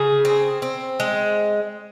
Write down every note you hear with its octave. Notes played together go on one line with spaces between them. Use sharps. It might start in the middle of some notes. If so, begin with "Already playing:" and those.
Already playing: C#3 G#4
C4
C4
G#3